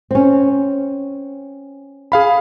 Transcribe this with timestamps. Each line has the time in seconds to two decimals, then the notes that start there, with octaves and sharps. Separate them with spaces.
0.11 C4 C#4
2.12 G#4 F5 B5